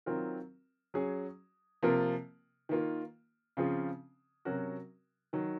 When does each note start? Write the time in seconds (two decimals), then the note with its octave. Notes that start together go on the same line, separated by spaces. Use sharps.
0.06 D#3 F#3 C4 F4 A#4
0.94 F#3 C#4 G#4
1.83 C3 F3 A#3 F4 A#4
2.69 D#3 A#3 F4
3.57 C#3 F3 C4 F4 G#4
4.45 C3 F#3 C#4 F#4 A#4
5.33 D#3 F#3